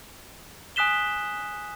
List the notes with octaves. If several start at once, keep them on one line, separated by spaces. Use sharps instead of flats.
G#5 D#6 F#6 B6 E7 G7